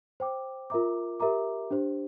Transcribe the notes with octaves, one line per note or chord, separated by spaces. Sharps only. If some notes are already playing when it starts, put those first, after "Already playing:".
C5 G5 D6
F4 A#4 E5 A#5 D6
G4 A#4 E5 A#5 D6
D4 G4 C5